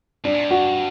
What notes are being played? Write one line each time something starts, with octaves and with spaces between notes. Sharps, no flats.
G2 D4
A#2
G2
F#4